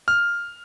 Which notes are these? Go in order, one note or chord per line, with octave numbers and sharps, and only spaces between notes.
F6